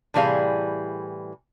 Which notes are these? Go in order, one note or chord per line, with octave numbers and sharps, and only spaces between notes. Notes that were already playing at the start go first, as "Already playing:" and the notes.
A2 C3 E3 G3 G#4 F5